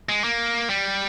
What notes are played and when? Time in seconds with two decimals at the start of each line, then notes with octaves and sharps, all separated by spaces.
0.09 G#3
0.24 A#3
0.70 G3